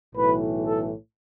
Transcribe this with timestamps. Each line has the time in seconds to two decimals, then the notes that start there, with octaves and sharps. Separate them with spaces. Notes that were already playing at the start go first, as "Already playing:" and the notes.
0.14 B1 A2 E3 B4
0.63 A4